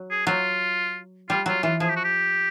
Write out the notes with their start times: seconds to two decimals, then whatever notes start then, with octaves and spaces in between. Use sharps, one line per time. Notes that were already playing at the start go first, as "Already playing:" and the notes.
Already playing: F#3
0.10 G#4
0.26 F#3 F4
1.29 G3 F4
1.46 F#3 F4
1.63 E3 F4
1.80 F3 G#4
1.89 G4
1.96 F#4
2.04 G4